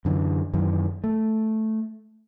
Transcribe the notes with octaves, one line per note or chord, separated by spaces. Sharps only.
F#2 D3 E3
F#2 D#3 E3
A3